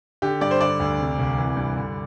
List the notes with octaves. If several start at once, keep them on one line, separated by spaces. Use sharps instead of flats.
D3 G4
G2 D5
C5
D3 D5
D2
C3
C2
E3
G2
D3